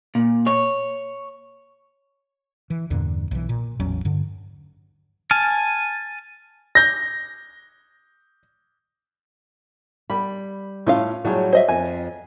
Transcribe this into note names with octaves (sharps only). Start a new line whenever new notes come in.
A#2
C#5
E3
E2 G2 A#2 D3
B1 E3
A#2
A1 E2 F#3 C#4
G2 D3
G#5 A5 F6
G6 A#6
G3 B5
A2 C#4 F4 F5
A2 F#3 G3 G#4 C#5
C5 D#5 E5
F2 G#5